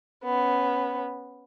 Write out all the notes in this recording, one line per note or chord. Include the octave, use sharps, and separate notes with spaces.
B3 C#4